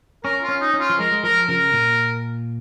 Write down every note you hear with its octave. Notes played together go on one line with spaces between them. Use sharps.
C#4 A#4
F4
C#4
D#4
C#4
F4
F3
G#3 A#4
G#3
F3 A#4
C#3 A#4
A#2